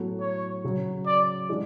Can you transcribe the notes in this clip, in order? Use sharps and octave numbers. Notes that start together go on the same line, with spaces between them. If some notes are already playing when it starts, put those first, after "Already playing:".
Already playing: A2 F#3 B3 F#4 A4
C#5
C#3 F#3 C#4
D5
E3 G#3 D4